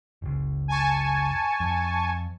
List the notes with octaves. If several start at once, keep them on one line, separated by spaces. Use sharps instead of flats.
F#1 C#2
G#5 A5 C#6
F2